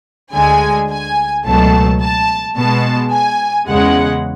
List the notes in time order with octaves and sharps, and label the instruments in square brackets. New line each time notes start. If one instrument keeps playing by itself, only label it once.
[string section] D2 D3 G#3 G#5
G#5
C#2 B2 F#3 A3 A5
A5
B2 G#3 B3 A5
G#5
E2 C#3 G#3 F#5